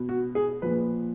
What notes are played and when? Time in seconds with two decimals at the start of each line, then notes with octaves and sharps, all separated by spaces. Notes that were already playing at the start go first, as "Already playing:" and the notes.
Already playing: B2
0.09 F#4
0.35 G#4
0.62 A#2 F3 B4